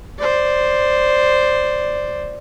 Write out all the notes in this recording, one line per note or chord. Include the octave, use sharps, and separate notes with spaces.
C5 D5